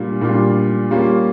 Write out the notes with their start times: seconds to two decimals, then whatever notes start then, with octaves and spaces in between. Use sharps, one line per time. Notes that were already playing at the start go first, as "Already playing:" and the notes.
Already playing: A#2 G3 D4 F4
0.21 A#2 G3 D4 F4
0.91 G3 A#3 C#4 F4